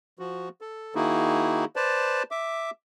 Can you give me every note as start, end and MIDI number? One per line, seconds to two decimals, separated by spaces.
0.19 0.49 53
0.19 0.49 66
0.61 0.94 69
0.95 1.65 51
0.95 1.65 58
0.95 1.65 63
0.95 1.65 64
0.95 1.65 66
0.95 1.65 68
1.76 2.23 71
1.76 2.23 72
1.76 2.23 74
1.76 2.23 81
2.31 2.70 76
2.31 2.70 86